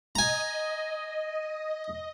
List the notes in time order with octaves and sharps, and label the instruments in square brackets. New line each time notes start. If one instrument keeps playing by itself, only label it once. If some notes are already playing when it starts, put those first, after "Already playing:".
[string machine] D#5 [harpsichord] G#5 A#5